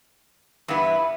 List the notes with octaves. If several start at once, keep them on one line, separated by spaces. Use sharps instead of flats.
G2 E3 B3 E4